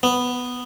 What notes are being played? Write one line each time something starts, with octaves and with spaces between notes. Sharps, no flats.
B3